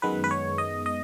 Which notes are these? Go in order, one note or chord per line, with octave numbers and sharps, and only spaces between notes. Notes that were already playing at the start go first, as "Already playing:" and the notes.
F#2 D#3 G#3 B3 B4
B4
C#5
D#5
D#5